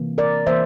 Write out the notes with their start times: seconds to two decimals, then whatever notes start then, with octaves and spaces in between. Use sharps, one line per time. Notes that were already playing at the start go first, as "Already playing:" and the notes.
Already playing: C3 E3 A#3
0.18 A#4 D5
0.47 E3 A#3 C5 E5